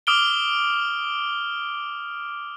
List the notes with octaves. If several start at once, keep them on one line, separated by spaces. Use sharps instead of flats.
D6 D#6 F6 D7 G7